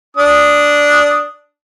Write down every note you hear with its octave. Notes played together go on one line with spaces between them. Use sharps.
D4 D#6